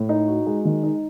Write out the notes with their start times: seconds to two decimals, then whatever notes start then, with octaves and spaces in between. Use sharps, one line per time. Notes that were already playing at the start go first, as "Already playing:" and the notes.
Already playing: A2
0.09 D#4
0.28 F#4
0.46 G#3
0.65 D#3
0.84 D#4